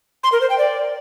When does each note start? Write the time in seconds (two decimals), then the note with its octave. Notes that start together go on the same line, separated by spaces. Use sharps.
0.23 C6
0.32 A#4
0.41 C5
0.50 G5
0.58 D5